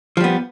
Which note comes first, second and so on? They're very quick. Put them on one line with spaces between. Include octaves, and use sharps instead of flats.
F3 G3 B3